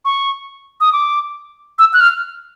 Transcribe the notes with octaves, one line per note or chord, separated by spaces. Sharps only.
C#6
D#6
D6
E6
F#6
F6